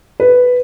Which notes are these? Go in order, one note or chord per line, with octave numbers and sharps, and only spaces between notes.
B4